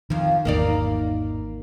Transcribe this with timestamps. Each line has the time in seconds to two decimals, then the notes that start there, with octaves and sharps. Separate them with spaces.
0.10 F2 D#3 F3
0.45 G#1 E2 A#3 D#4 D5